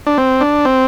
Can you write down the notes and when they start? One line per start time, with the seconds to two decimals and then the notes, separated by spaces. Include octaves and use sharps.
0.07 D4
0.18 C4
0.41 D4
0.65 C4